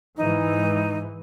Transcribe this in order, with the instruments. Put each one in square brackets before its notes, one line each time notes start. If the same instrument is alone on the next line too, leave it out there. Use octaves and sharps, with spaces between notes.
[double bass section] G#2 E3 [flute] D#4